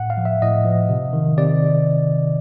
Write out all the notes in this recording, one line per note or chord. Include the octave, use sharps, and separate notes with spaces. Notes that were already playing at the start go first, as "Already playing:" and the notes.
Already playing: A2 F#5
F5
F3
E5
A2 D#5
F3
C3
D#3
C3 D5